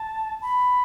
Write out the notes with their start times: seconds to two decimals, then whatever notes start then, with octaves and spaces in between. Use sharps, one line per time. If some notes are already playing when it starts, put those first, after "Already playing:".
Already playing: A5
0.42 B5